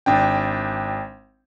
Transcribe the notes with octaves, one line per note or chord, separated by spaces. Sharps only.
G#1 D4 G5